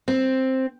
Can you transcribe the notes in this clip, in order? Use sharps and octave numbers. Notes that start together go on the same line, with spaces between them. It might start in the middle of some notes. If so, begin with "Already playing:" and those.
C4